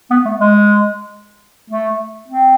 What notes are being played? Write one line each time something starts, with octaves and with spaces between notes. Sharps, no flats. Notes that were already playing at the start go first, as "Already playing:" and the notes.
B3
A3
G#3
A3
C4